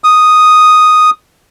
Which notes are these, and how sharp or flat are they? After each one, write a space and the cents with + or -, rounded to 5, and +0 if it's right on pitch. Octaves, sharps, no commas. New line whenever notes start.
D#6 +0